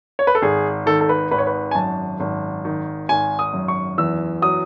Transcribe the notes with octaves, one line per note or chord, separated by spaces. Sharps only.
C#5
B4
A4
G#1 G#4
D#3 A4
A4
B4
G#1 B4
C#5
B4
G#5
F#2 A5
G#1
D#3
G#1 G#5
D#6
F#2
C#6
E2 E6
F#3 D#6